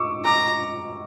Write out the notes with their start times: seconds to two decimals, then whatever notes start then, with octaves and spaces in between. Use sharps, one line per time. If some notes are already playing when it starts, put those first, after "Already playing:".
Already playing: C#6 D6 E6
0.25 A#5 D6